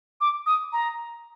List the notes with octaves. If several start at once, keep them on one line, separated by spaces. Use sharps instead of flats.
D6
D#6
A#5